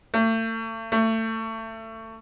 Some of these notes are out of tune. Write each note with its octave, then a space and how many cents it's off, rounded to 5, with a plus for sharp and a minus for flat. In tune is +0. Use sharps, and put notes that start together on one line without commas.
A3 +35
A3 +25